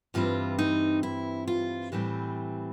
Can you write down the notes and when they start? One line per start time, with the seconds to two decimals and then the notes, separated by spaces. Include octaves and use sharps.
0.14 G2 E3 G3 C4 F4
0.59 D#4
1.03 E4
1.48 F4
1.92 A2 E3 G3 C4